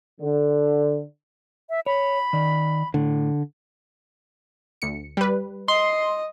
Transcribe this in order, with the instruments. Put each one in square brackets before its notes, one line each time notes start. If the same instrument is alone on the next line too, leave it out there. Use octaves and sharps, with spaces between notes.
[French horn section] D3
[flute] E5
[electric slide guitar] C#5 [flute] B5
[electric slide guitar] D#3 D5
[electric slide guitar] A2 [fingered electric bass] D3
[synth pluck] D2 C#7
G3 B4
[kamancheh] D#5 [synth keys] C6